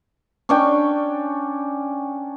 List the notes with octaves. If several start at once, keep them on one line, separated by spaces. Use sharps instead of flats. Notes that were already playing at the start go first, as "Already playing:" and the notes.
C#4 D4 G5 C#6